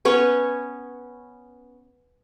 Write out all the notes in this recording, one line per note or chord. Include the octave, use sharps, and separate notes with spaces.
B3 C#4 C#5 C#6